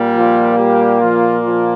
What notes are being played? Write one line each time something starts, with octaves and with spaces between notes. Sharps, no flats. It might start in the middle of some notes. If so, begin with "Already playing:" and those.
Already playing: A#2 G3 A#3
F3 F4
G3 G4
F3 F4
F3 F4